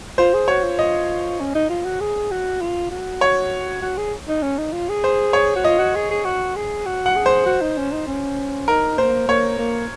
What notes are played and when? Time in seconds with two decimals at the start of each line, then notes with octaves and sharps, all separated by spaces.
0.18 F4 C5
0.34 G#4
0.48 F#4 C#5
0.63 F4
0.79 D#5
1.40 C#4
1.55 D#4
1.69 F4
1.85 F#4
2.01 G#4
2.31 F#4
2.61 F4
2.91 F#4
3.21 C#5
3.82 F#4
3.97 G#4
4.28 D#4
4.42 C#4
4.58 D#4
4.73 F4
4.89 G#4
5.04 C5
5.33 C#5
5.56 F#4
5.64 F4 D#5
5.79 F#4
5.95 G#4
6.10 G#4
6.25 F#4
6.56 G#4
6.86 F#4
7.06 F#5
7.16 G#4
7.26 C5
7.46 F#4
7.62 D#4
7.77 C#4
7.92 D#4
8.07 C#4
8.68 D#4 A#4
8.98 A#3 C5
9.28 A#3 C#5
9.58 A#3